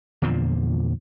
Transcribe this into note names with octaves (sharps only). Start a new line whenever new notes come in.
E2 A#2 D3 F3